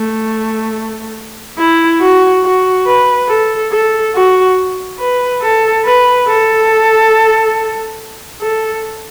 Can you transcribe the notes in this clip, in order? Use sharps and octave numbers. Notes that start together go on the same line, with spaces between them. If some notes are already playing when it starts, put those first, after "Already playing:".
Already playing: A3
E4
F#4
F#4
B4
A4
A4
F#4
B4
A4
B4
A4
A4